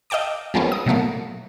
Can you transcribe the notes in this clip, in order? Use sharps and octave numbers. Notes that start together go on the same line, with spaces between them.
D#5 F5 G5 A5 D6
F3 G3 G#3 A#3 B3 C#4
D#6
B2 F#3 A3 A#3